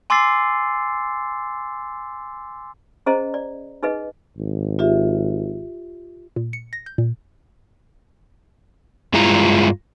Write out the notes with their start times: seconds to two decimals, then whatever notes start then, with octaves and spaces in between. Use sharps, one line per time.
0.10 G#5 C6 D6 E6 A6 C7
3.06 C#4 G#4 C5 D#5 A#5
3.34 D5
3.83 D#4 G#4 B4 D#5
4.37 G#1
4.79 F4 G4 E5
6.36 A#2
6.53 C#7
6.73 A#6
6.86 G6
6.98 A#2
9.14 G2 G#3 E4 F4 A#5